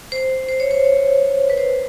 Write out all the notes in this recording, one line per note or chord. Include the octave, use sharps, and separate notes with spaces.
C5
C5
C#5
C5
C#5
B4
C5